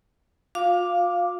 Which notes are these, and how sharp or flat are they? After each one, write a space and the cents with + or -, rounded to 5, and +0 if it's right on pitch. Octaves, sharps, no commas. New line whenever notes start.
F4 +40 F5 +0 D6 +0